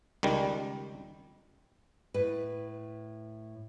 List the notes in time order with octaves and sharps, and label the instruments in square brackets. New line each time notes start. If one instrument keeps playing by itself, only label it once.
[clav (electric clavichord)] C#2 D#3 G3
[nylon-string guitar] A2 B4